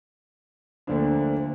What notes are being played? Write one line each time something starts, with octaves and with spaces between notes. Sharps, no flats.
D2 D3 F3 A#3 D4